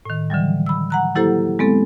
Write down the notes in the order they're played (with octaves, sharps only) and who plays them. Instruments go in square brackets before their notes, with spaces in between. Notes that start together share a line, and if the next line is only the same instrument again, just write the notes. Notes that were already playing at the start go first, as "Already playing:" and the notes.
[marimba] A2 D#3
D3 E3 F#3 G3
B5 E6
F#5 A#5 F#6
F#3 A#3 E4 G4 A4 C5
G#3 B3 C4 A4